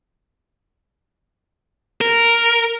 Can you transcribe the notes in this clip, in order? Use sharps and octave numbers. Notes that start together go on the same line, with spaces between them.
A#4